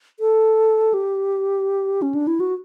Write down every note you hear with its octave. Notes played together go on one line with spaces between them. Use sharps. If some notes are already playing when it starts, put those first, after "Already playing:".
A4
G4
C#4
D4
E4
F#4